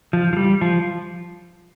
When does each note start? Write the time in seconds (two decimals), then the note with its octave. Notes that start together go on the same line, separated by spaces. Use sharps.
0.13 F3
0.33 F3
0.37 G3
0.61 F3